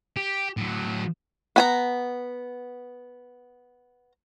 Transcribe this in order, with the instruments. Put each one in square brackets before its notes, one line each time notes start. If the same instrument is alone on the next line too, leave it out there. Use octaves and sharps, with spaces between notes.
[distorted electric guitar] G4
A2 F#3
[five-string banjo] B3 G#5 A#5